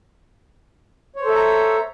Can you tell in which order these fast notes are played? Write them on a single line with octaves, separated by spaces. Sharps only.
C#5 C5 A4 E5 A#5